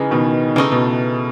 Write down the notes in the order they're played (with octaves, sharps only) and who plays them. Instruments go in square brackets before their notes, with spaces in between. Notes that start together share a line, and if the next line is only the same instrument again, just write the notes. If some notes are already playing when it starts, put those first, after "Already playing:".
Already playing: [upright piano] C#3 [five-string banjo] E3 G#3 D#4 G#4
[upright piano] B2 D#3
[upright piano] C#3 [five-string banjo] E3 A3 D#4
[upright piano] B2